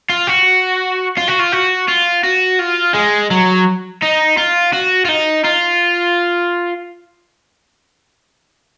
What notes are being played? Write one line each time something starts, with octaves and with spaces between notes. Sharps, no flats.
F4
F#4
F4
F#4
F4
F#4
F4
F#4
F4
G#3
F#3
D#4
F4
F#4
F4
D#4
F4